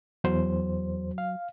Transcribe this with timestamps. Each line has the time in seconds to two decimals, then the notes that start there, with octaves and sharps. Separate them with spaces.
0.24 E2 F#3 C5
1.18 F5